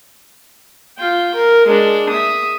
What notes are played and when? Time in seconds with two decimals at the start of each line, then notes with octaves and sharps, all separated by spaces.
0.98 F4 G5
1.34 A#4
1.67 G#3 D4
2.09 E5 D#6